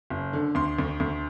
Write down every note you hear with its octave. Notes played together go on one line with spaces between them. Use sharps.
F#1
D3
D2 C6
D2
D2